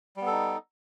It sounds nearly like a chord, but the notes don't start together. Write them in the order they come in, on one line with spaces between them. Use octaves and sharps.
G3 B3 A4 D#4